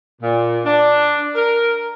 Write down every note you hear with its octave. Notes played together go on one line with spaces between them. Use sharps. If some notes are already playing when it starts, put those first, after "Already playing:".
A#2
D4
A#4